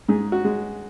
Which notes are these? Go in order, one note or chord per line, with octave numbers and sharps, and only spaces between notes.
G#2 G#4
F#4
G#3